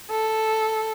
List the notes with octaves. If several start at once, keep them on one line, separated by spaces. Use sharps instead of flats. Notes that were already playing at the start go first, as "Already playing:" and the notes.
A4